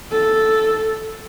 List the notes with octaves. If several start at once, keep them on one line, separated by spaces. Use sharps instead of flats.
A4